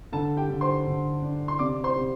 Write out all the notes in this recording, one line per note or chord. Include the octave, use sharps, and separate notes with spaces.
D3 A4 A5
G4 G5
D3
C5 C6
D3
D4
C6
C3 D5 D6
C5 C6
C3